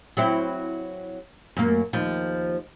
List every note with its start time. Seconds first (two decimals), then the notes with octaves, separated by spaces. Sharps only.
0.17 F#3 C4 E4
1.57 F#2 A#3
1.93 D#2 F3